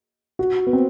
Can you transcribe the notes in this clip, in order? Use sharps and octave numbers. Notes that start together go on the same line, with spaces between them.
F#4
B3
C4